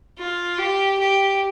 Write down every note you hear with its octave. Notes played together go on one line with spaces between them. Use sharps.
F4
G4
G4